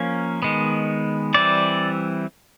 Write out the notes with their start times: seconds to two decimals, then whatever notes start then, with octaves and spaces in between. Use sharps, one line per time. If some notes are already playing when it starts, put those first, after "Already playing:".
Already playing: F3 A#3 C#4
0.42 D#3 G#3 B3
1.34 E3 G3 C4 D5